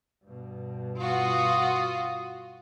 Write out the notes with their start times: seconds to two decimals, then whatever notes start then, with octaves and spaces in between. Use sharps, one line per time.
0.25 G2 B2
0.98 F4 F#4 D#6